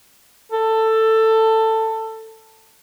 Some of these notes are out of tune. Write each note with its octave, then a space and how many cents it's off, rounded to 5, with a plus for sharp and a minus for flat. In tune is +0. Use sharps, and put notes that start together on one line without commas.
A4 +15